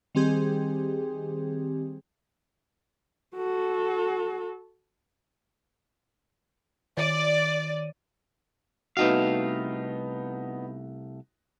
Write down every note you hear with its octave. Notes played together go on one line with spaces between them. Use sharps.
D#3 G3 C4 G4 G#4
F#4 A4
D#3 C#5 D5 D#7
C2 A3 B3 D#4 F#4 F5